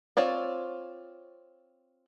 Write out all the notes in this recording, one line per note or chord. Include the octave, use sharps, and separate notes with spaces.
C4 F4 C#5 D5